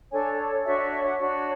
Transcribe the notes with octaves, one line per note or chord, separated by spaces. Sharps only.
D4 A4 C#5 G#5
D4 F#4 C#5 E5
E5
E5
F#5
D4 F#4 C#5